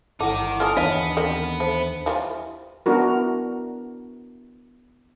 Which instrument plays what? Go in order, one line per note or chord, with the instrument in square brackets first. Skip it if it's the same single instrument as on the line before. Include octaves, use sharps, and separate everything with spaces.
[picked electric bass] G1 [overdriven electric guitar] D#3 D#4 [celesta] E4 F#5 D6 [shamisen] A4
[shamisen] A#3 F4 A4 [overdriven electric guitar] A#4 [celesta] G#5 D#6 F6
[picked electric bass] D#2 E3 D4 [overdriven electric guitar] B3 [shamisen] C#5 D#5 [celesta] B6 D#7
[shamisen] C4 A#4 D#5
[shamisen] A3 [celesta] C5
[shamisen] E3 G3 F4
[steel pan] B3 D4 E4 F#4 A#4